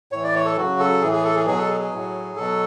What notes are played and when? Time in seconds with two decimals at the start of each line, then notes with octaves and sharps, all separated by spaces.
0.12 A2 E3 C#5
0.23 D5
0.35 C#5
0.45 A4
0.56 C#3 F#3 F#4
0.79 A4
1.02 A2 E3 G#4
1.12 G#4
1.24 A4
1.36 G#4
1.46 B2 F#3 G#4
1.58 A4
1.69 G#4
1.81 G#4
1.92 A2 F#3
2.36 B2 F#3 A4